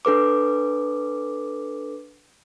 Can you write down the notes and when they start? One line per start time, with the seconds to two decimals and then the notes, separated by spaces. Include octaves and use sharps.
0.05 D4 A4 B4 D6